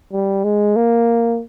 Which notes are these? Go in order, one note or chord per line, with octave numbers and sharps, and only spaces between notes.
G3
G#3
A#3